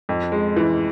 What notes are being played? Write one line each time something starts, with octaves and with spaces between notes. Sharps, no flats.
F2
G#3
E3